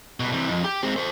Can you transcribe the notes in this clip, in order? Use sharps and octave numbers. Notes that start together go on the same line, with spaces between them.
C2 B2
C3 E3
F2
G4
G#3 C4
A4 C5